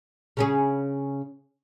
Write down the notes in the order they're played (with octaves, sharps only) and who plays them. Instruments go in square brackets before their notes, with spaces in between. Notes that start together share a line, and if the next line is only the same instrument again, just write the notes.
[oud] C#3 C#4 G#4